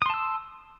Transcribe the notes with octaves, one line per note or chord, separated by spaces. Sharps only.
A5 C6 D#6 E6